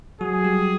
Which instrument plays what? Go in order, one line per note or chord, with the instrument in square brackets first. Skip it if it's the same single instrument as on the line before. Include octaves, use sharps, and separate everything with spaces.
[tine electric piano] F#3 F#4 [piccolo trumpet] G#4
[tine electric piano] G3 G4